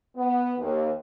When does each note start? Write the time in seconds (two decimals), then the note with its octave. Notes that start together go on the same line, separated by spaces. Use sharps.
0.16 B3
0.59 D#2